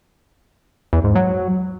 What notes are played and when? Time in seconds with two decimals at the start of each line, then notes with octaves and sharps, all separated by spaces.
0.93 E2
1.04 G#2
1.15 F#3